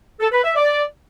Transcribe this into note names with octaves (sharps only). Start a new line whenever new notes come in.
A4
B4
E5
D5